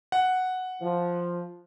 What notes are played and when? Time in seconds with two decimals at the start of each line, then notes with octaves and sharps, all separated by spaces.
0.12 F#5
0.82 F3